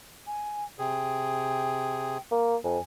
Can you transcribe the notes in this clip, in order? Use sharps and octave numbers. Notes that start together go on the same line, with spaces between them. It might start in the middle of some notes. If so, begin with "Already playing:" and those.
G#5
C3 G#4 G5
A#3
F2 G#5